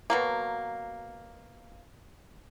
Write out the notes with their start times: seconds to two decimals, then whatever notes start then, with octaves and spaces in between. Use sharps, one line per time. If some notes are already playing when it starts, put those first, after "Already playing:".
0.10 B2 F#3 A#3